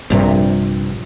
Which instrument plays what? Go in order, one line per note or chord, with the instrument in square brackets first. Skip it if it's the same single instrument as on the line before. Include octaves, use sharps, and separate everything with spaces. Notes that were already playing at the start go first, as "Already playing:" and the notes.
[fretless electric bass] A#1 G2 C3